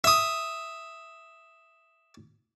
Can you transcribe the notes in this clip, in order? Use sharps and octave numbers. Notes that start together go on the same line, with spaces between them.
E5 D#6